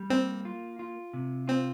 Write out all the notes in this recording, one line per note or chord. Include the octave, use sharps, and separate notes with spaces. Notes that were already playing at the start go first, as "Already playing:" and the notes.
Already playing: G3
A#3 C4
F4
F4
C3
C4 F4